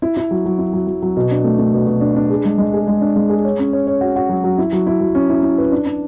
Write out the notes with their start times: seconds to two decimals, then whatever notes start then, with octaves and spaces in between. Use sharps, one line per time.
0.02 E4
0.17 E4
0.31 F#3
0.45 F#3
0.59 E4
0.73 F#3
0.87 F#3
1.02 F#3
1.17 B2
1.31 D4
1.44 A3
1.58 A3
1.74 B2
1.87 B2
2.01 D4
2.16 D4
2.30 G#4
2.45 G#3
2.58 G#3
2.74 G#4
2.88 G#3
3.01 D4
3.16 G#3
3.29 G#4
3.45 C#5
3.59 C#4
3.73 C#5
3.87 C#5
4.01 F#4
4.16 F#4
4.29 F#3
4.44 F#3
4.58 E4
4.73 F#3
4.87 E4
5.01 F#3
5.15 C#4
5.29 E4
5.43 E4
5.58 B4
5.72 D4
5.86 D4